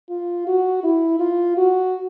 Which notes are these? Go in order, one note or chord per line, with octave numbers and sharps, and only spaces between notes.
F4
F#4
E4
F4
F#4